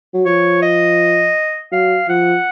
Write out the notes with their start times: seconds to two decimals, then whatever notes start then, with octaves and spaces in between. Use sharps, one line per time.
0.14 F#3
0.25 F3 C#5
0.62 D#5
1.71 F#3 F5
2.08 F3 F#5